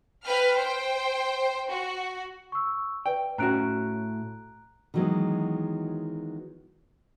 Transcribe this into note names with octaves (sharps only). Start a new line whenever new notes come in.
B4 G5 F6
C5 G5
F#4
C#6 E6
B4 D5 G5
A2 C#4 F#4 A#5 F#6 D7
D#3 E3 F#3 G#3 B3